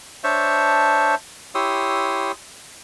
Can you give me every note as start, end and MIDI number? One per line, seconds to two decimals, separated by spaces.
0.24 1.15 62
0.24 1.15 72
0.24 1.15 73
0.24 1.15 76
0.24 1.15 81
1.55 2.32 64
1.55 2.32 67
1.55 2.32 73
1.55 2.32 84
1.55 2.32 87
1.55 2.32 88